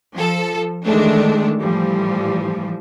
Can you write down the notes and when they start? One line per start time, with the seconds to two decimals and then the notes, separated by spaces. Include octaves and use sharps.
0.14 F3 A4
0.86 D#3 E3 G#3 A3 D4
1.60 A2 E3 F3 G3